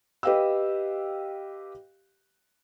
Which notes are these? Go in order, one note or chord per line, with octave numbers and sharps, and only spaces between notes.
G4 B4 D#5 F5 G5 E6